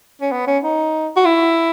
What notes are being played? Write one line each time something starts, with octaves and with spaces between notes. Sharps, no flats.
C#4
B3
C#4
D#4
F#4
E4